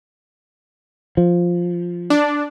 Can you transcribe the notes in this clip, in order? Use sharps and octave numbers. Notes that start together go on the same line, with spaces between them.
F3
D4